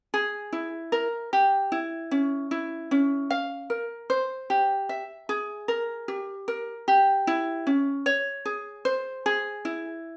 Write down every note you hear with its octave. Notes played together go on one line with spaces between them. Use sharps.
G#4
E4
A#4
G4
E4
C#4
E4
C#4
F5
A#4
C5
G4
E5
G#4
A#4
G4
A#4
G4
E4
C#4
C#5
G#4
C5
G#4
E4